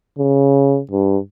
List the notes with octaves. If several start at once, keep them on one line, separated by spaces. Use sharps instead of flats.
C#3
G2